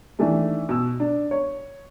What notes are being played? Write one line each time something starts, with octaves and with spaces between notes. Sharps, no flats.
D#3 E3 A3 D4
B2 E6
D4
C#5